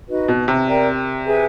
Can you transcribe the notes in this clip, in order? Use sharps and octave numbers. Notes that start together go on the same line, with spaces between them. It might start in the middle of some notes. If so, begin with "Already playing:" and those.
D#4 F#4 B4 D#5
B2
C3
A#4 D5 G5 A#5
G#4 B4 E5 G#5